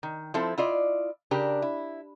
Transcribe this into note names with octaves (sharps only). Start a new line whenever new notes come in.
D#3
F3 C4 E4 A4
E4 F4 D5 D#5
C#3 D4 G4 A#4
E4